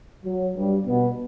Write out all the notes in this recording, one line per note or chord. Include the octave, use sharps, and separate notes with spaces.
F#3
G2 G3
B2 B3